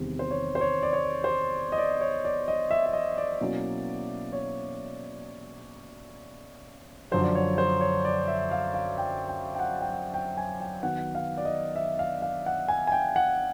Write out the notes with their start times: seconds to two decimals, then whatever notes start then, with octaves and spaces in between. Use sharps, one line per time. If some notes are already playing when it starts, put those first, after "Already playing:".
Already playing: E2 C3 D#3 G3 C4
0.19 C5
0.31 C#5
0.55 C5
0.61 C#5
0.83 D5
0.93 C#5
1.24 C5
1.72 D#5
1.78 D5
2.01 C#5
2.25 D5
2.48 D#5
2.71 E5
2.86 E5
2.93 D#5
3.18 D5
3.41 B2 F#3 A#3 C#4 E4
4.33 C#5
7.11 F#2 D3 F3 C5
7.23 D5
7.35 C#5
7.58 C5
7.81 C#5
8.05 D5
8.28 E5
8.51 F5
8.74 F5
8.98 G5
9.28 G5
9.55 G5
9.59 F#5
9.81 G5
9.91 F#5
10.14 G5
10.37 G#5
10.60 G5
10.83 D#3 F#3 B3 F#5
11.15 F5
11.38 D5
11.45 D#5
11.76 E5
11.99 F5
12.22 F5
12.46 F#5
12.68 G#5
12.87 G#5
12.92 G5
13.16 F#5